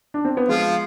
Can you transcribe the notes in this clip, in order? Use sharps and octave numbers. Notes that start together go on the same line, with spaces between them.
D4
C4
B3
F3 G#3 F4